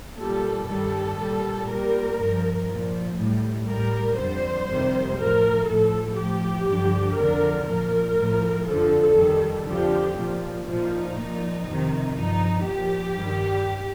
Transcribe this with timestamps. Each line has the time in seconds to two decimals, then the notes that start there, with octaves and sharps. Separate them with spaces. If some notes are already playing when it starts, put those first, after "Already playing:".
0.17 A#2 G3 A4
0.67 G2 D#3 G3 A4
1.17 A#2 G3
1.67 A#2 G3 A#4
2.16 G2
2.21 F3
2.67 A#2 F3
3.16 A2 G3
3.66 A2 G3 A#4
4.17 F2 D3 G3 C5
4.66 F2 C3 D#3 G3
5.16 A2 F3 A#4
5.66 A2 F3 A4
6.16 A2 F3 G4
6.66 G2 D3 F3
7.16 F2 D3 F3 A#4
7.65 A#2 F3 A#4
8.16 A2 F3
8.65 F2 D3 F3 A4
9.16 F2 D#3 G3
9.65 F2 D3 F3 G4
10.15 A#2 F3
10.65 A#2 F3 D#4
11.15 A#2 F3
11.65 F2 C3 D#3
12.15 G2 F3 D#4
12.64 A#2 F3 G4
13.14 G2 D#3 G3